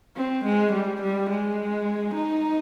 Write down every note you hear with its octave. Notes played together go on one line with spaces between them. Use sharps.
C4
G#3
G3
G3
G#3
D#4